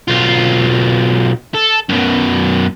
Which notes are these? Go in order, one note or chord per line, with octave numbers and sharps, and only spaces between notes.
B1 F4
A4
F#2 B2